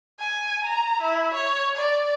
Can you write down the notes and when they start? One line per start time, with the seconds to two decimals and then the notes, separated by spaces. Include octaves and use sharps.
0.20 G#5
0.64 A#5
1.02 E4
1.34 C#5
1.76 D5